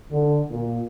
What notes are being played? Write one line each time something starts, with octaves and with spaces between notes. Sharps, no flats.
D3
A#2